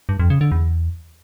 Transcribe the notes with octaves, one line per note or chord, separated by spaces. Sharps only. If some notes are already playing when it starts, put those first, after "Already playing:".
G2
F2
C#3
D3
E2